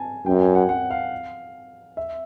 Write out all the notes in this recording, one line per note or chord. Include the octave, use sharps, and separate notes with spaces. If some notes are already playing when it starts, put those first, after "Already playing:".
Already playing: G#5 A5
F#2 G5
G#5
F#5
F#5
F5
E5